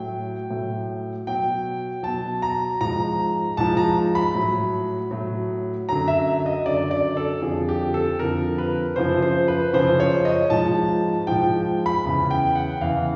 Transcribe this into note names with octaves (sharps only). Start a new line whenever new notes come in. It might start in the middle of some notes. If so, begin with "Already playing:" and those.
Already playing: A2 F#3 G5
A2 F#3
B2 F#3 G5
B2 F#3 A5
A#5
G#2 F3 A#5
G#2 F3 A5
A#5
B5
A2 F#3
A2 F#3
F#2 D3 F#3 A#5
E5
E5
D#5
F#2 D3 F#3 D5
D5
A4
F2 D3 F3 G#4
G4
A4
F2 D3 F3 A#4
B4
F#2 C#3 F3 C5
C5
B4
F#2 C#3 F3 C5
C#5
D#5
G#2 F3 A5
G#2 F3 G5
B5
E2 C#3 E3
G5
F#5
E2 C#3 E3 F5